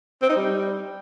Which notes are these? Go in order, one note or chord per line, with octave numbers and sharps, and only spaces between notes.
C4
D#4
G3